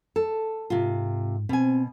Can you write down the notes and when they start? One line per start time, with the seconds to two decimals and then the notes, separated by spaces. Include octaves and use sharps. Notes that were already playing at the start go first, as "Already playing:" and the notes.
0.16 A4
0.70 G#2 C3 F4
1.49 B2 C4 G#5